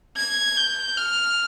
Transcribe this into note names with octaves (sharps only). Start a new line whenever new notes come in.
G#6
G6
F6